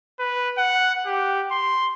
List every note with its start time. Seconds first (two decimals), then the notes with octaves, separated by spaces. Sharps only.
0.20 B4
0.58 F#5
1.06 G4
1.51 C6